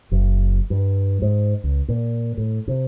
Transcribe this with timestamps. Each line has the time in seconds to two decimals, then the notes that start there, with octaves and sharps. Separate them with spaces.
0.11 F#1
0.70 G2
1.22 G#2
1.64 C#2
1.88 A#2
2.37 A2
2.68 C3